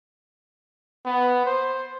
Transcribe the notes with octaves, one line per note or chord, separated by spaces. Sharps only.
B3
C5